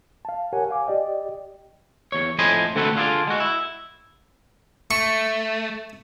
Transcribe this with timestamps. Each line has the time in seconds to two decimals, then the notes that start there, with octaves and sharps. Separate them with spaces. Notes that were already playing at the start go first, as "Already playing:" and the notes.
0.25 F5 A5
0.53 G4 A#4 C#5 F#5 G#5
0.70 F5 G#5 D6
0.87 G4 D5 D#5 G5
2.12 E2 C#5
2.39 F2 A2 C5 D#5 G#5 B5
2.75 D3 A3 C4 F#4 A4 B4
2.96 D3 F4 G#4 A#4 D5
3.27 G#3 F#4
3.40 E4
4.91 A3 C#6